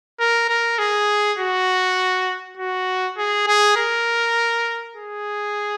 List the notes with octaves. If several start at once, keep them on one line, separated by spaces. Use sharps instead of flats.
A#4
A#4
G#4
F#4
F#4
G#4
G#4
A#4
G#4